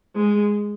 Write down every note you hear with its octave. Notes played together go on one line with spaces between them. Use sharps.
G#3